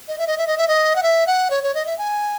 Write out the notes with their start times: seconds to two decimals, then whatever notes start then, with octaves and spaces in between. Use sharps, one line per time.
0.08 D#5
0.18 E5
0.27 D#5
0.38 E5
0.47 D#5
0.58 E5
0.68 D#5
0.96 F#5
1.03 E5
1.27 F#5
1.51 C#5
1.63 C#5
1.75 D#5
1.86 E5
1.98 G#5